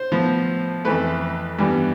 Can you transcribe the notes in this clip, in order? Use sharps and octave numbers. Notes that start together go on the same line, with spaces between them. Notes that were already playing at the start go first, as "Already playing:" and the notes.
Already playing: C5
A2 F3 B3
F2 E3 A3 B4
G2 E3 G3 B3